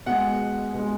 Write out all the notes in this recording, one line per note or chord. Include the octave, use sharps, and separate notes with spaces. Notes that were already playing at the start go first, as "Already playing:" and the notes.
B2 G#3 F#5
B2 G#3